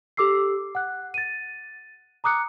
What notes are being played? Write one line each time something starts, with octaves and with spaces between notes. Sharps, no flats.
G4 A4 D6 E6 C7
F#5 F#6
A6 D#7
A#5 D6 D#6 F#6 C#7